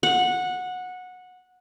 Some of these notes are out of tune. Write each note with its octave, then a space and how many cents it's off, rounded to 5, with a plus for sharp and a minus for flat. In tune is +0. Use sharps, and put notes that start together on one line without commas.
F#5 -15